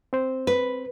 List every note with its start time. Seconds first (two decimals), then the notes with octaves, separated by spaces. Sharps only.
0.13 C4 C5
0.47 B4